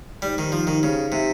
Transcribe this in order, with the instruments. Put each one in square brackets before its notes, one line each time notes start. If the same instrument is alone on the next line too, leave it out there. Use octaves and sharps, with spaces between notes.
[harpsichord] G3 [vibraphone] D#4 G4 C5
[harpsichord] D#3
F3
D#3
C#3
C3